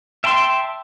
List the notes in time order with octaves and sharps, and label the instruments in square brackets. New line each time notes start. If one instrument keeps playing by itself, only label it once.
[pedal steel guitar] E5 G5 A5 C6